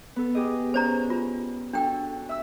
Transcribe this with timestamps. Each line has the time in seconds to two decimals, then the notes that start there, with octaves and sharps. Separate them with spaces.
0.16 B3 A4
0.35 G4 G#4 D#5
0.74 C#4 C5 D5 A#5
1.10 F4
1.73 D4 F#4 A4 G5
2.29 E5 E6